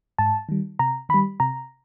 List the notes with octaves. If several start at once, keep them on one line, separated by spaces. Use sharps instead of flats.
G#2 A5
D#3 G3
C3 A#5
D#3 B5
G3
C3 A#5